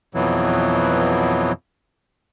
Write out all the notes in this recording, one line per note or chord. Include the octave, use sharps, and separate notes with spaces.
F2 B2 E3 F#3